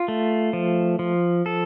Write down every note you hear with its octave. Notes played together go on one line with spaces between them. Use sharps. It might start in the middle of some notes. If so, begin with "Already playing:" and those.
Already playing: F4
A3
F3
F3
A4